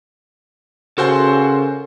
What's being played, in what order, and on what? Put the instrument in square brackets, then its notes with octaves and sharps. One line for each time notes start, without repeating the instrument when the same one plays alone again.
[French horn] C#3 [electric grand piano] F#4 C5 C6 [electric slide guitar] A4 A#4 G#5